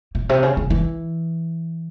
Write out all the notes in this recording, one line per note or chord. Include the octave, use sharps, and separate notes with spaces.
A#2
C3
C#3
C#3
E3